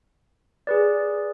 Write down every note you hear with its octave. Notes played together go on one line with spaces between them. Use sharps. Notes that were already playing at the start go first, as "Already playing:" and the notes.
G#4 B4 D5